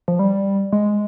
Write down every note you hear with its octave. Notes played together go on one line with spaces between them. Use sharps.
F3
G3
G#3